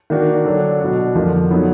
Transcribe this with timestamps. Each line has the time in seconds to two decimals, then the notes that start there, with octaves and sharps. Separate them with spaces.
0.10 D#3 A#3 D4 F#4
0.45 D3 F#3 D4
0.80 B2 F#3 D4 F#4
1.15 F2 D3 F3 A#3
1.50 D3 F#3 B3 D#4